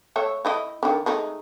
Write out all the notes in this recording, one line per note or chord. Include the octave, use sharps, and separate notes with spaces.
A3 C#5 E5
A3 E4 D#5
D3 D#3
G#3 A3 D#4